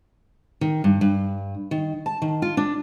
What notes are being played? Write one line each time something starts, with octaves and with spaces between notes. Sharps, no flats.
D#3
G2
G2
D#3
A5
D#3
F4
D4